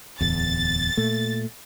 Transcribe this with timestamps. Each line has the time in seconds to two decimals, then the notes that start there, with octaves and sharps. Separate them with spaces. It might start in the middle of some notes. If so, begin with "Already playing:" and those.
0.21 D1 E2 A6
0.97 A#2 A3